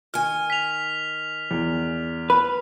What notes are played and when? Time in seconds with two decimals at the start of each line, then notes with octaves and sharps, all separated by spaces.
0.14 D#3 G#5 F6
0.50 B6 F7
1.51 E2
2.30 B4